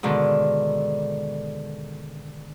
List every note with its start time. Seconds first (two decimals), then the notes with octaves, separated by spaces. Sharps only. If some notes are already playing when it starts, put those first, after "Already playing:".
0.03 G#2 B2 D3 D#3